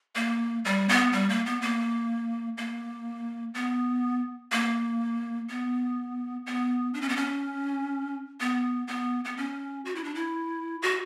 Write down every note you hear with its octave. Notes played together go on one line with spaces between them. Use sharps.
A#3
G3
B3
G3
A#3
B3
A#3
A#3
B3
A#3
B3
B3
D4
C#4
B3
C#4
B3
B3
B3
C#4
F#4
E4
D4
E4
F#4